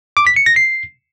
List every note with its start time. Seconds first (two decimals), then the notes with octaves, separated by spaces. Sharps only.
0.17 D6
0.27 B6
0.36 C#7
0.46 A#6
0.56 C7